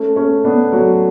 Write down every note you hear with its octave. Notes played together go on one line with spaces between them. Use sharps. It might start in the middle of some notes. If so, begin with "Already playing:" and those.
Already playing: A3 C#4
A3 C#4
B3 D4
F#3 A3